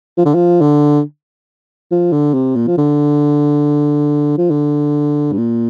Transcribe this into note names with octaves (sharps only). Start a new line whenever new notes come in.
F3
D3
F3
D3
F3
D3
C3
A#2
F3
D3
F3
D3
G2
A#2